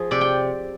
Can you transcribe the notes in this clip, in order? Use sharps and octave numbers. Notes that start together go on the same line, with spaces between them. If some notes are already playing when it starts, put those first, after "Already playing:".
Already playing: F3 G#4
C3 D5
G5